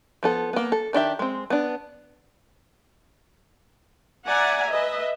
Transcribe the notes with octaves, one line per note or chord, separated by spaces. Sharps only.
F3 B3 A4
A#3 B3
A4
D#3 D4 G4 E5
G#3 C4
B3 D4
D5 E5 F#5 G#5 A#5
B4 D#5 E5